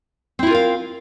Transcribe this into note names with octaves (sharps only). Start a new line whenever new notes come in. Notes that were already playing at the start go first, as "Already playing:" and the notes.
C4 E4 F4 A#4 F5